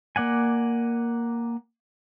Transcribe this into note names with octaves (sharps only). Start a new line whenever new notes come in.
A#3 D5 F#5 G#5